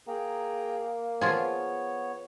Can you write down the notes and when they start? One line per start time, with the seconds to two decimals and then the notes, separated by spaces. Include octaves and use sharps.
0.08 A#3 G#4 G5 A#5
1.21 F3 B3 F4 G#4 C#5